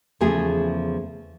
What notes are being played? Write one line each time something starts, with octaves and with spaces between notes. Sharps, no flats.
E2 C#3 F3 A3 G#4